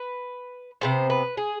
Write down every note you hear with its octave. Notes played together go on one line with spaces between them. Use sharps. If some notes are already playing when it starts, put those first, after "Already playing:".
Already playing: B4
C3 G3 B3 C5
B4
G#4